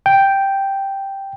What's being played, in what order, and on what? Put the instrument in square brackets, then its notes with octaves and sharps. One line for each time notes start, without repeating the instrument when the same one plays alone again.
[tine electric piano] G5